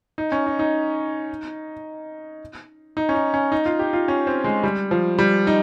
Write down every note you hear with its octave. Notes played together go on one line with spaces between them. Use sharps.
D#4
C#4
D#4
D#4
D#4
C#4
D#4
C#4
D#4
F4
G4
F4
C#4
C4
G#3
G3
F3
G3
D#4